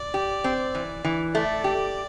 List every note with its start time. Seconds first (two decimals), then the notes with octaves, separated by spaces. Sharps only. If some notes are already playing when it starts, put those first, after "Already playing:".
Already playing: D5
0.14 G4
0.44 C4
0.75 E3
1.04 E3
1.35 A3 D5
1.64 G4